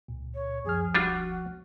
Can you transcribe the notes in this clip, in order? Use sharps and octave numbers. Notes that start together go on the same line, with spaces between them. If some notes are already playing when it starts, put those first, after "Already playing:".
C#2 A#2
C#5
C#2 F#2 F3 G#4 F6
E1 G3 D4 F4 F#4